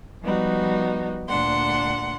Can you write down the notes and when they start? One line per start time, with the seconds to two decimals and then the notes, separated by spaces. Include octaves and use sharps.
0.23 F3 G3 B3 D#4 F#4
1.27 D2 A#2 D4 F#5 C6